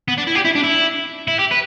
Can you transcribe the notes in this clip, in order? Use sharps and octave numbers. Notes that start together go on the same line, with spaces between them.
B3
D4
E4
G4
E4
D4
E4
E4
G4
B4